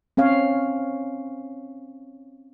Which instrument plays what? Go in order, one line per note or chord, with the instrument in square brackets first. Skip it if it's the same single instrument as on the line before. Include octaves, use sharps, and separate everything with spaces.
[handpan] C4 C#4 C#5 F5